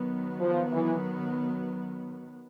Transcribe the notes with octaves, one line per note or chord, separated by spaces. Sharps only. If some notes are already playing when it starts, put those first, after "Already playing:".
Already playing: D#3 F#3 B3
F3
E3